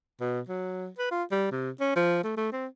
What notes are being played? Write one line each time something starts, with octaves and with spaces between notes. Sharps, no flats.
B2
F#3
B4
F4
G3
C3
C#4
F3
A3
A3
C4